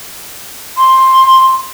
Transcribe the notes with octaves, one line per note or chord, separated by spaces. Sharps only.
C6